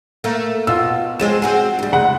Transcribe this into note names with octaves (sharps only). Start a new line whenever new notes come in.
A3 A#3
B2 F4 E6
F3 G#3 C4 E7
C4 F#4 G#4
D2 G3
F#1 G#3 F#5